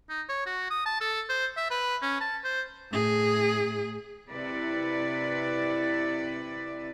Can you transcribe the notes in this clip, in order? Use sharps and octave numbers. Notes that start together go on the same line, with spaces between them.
D#4
C#5
F#4
D#6
A5
A4
C5
E5
B4
C#4
A5
C5
A2 G#4
C3 E4 B4 D5